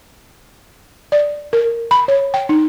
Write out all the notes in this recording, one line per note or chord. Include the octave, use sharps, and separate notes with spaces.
D5
A#4
B5
C#5
G5
D#4